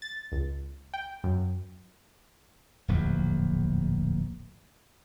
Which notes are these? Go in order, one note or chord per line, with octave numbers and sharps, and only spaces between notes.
A6
C#2
G5
F#2
D1 A#1 E2